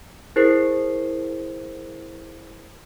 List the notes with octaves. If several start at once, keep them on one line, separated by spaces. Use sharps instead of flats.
E4 G#4 A#4 C5 C7